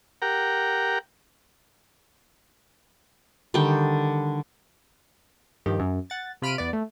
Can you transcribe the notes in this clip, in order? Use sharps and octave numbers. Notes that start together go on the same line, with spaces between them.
G4 A#4 F#5 G5 A#5
D3 D#3 G3 G5
G2 D#3 F3 G4
F#2
F#5 A6
C3 F4 B5 F6 D7 D#7
E2 B3 D5
A3